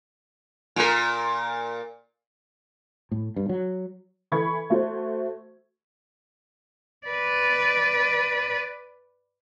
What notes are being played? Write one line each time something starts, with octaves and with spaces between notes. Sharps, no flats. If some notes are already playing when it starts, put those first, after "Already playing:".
A#2 A#4
A2
G2
F#3
E3 A4 B5 C#6 G#6
A3 F#4 C5
B4 D5